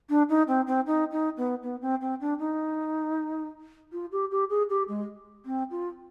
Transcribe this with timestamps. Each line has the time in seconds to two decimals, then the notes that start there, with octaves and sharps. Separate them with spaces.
0.09 D4
0.29 D#4
0.47 C4
0.67 C4
0.86 D#4
1.11 D#4
1.37 B3
1.63 B3
1.81 C4
2.01 C4
2.20 D4
2.39 D#4
3.92 F4
4.12 G4
4.31 G4
4.49 G#4
4.69 G4
4.88 G#3
5.45 C4
5.70 F4